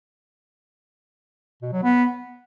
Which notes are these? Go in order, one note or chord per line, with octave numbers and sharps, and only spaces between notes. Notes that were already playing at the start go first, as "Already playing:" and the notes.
B2
F#3
B3